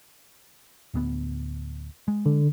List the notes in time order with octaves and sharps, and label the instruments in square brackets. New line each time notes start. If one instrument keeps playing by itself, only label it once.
[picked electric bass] D1 D2 B3
G#3
[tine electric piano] D3